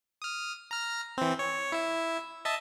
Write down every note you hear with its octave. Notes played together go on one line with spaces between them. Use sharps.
D#6 F6
A#5 F6
E3 C4
C#5
E4 E5
D#5 E5 A5